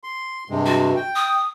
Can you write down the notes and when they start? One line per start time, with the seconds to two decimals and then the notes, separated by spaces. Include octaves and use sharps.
0.04 C6
0.50 G2 C3 G#3
0.66 F#4
0.96 G5
1.16 D#6